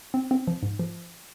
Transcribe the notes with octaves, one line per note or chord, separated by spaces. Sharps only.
C4
C4
F3
G#2
F3